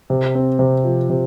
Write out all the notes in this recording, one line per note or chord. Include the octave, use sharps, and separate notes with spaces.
C3
C4
C3
F3
C3